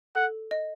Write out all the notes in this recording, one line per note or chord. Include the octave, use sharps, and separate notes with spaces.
A4 F#5
D#5